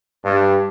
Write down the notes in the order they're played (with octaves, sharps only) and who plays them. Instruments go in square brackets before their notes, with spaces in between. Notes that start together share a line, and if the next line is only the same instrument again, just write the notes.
[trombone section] G2